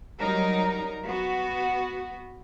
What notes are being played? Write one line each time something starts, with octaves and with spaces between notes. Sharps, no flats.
F#3 G3 D#4 A#4
B3 F#4